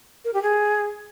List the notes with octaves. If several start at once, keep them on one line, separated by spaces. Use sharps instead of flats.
A#4
G4
G#4